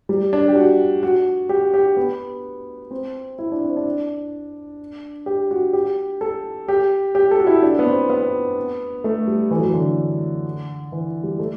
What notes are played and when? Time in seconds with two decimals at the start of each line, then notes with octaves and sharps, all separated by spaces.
0.09 G3
0.33 D4
0.48 G4
0.56 F#4
1.03 F#4
1.49 G4
1.74 G4
1.97 B3
2.91 C4
3.39 E4
3.52 D4
3.65 C4
3.77 D4
5.26 G4
5.51 F#4
5.73 G4
6.21 A4
6.68 G4
7.15 G4
7.31 A4
7.40 F#4
7.47 E4
7.62 D4
7.79 B3
7.86 C4
8.10 B3
9.04 A3
9.27 G3
9.51 E3
9.58 F#3
9.65 E3
9.74 D3
10.92 E3
11.24 G3
11.39 A3